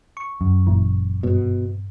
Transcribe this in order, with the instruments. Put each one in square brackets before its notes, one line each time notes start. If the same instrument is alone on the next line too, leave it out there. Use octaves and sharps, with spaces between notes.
[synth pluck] C#6
[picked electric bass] F#2
[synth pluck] G1 A#2 E3
[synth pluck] G2 [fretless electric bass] B2